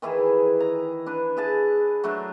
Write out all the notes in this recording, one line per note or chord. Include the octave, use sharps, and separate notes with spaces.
D#3 E3 E4 G#4
A#5
D4 B4
E4 G#4 A5
F#3 A3 D4 E4